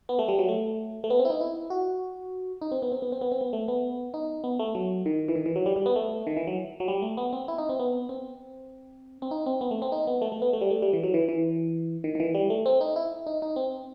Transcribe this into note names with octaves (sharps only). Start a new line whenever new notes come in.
B3
A3
G3
F#3
A3
A3
B3
C4
E4
D#4
E4
F#4
D#4
C4
B3
C4
B3
C4
B3
C4
B3
A3
B3
D#4
B3
A3
F#3
D#3
E3
D#3
E3
F#3
G3
G3
B3
A3
D#3
E3
F#3
F#3
G3
A3
B3
C4
E4
D#4
C4
B3
C4
C4
D#4
C4
B3
A3
C4
D#4
B3
A3
A3
B3
A3
G3
A3
G3
E3
F#3
E3
E3
D#3
D#3
E3
G3
A3
C4
D#4
E4
D#4
D#4
C4